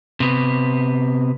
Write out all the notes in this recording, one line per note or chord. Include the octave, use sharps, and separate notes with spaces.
C3 B3